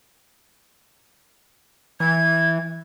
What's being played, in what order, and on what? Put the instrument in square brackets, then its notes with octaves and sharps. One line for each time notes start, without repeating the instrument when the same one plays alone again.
[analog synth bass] E3 [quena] G#6